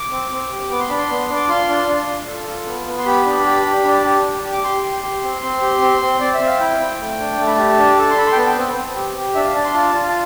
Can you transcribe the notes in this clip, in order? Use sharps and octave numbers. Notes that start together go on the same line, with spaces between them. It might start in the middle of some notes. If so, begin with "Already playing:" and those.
Already playing: D6
C4
C4
G4
B3 D6
C6
D4 B5
C6
B3
D4
D6
F4 C6
D4
D4
F4
A4
F4
B3
B3
C6
G4 B5
D4
G4
G4
D4
G4
G4
G4
D6
G4 C6
G4
G4
C4
C4
G4
C4
C4
C4 D5
E5
C4
F5
E4 G5
C4
A3
D4
A3 A5
B5
G4 A5
D4
A4
C6
A4 B5
C6
G5
B3 A5
G5
C4
C4
G4
G4
D4 E5
F5
D4 A5
C6
F4 A5
F4
A5